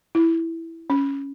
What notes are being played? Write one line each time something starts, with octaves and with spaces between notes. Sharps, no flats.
E4
C#4